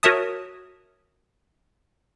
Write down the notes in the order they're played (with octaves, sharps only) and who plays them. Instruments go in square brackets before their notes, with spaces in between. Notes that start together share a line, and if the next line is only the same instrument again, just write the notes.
[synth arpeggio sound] F#4 A#4 C#5 E5 A5 D#6